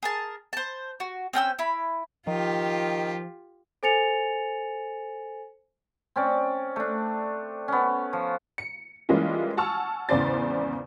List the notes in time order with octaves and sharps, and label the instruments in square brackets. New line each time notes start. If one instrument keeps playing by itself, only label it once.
[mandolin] G#4 A#4 A5
C5 A5
F#4
C4 C#4 G5 E6
E4 B5
[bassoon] D#3 [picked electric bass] F3 [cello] F4 G4
[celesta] A4 C5 G#5 A6 C#7 F7
[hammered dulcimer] C4 C#4 D5
A3 D4
B3 C#4
F3
[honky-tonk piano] C#7
E3 G3 G#3 A#3 C#4 F4
F#5 G#5 A5 C#6 E6 F6
G#1 E2 C#3 C5 D5 A6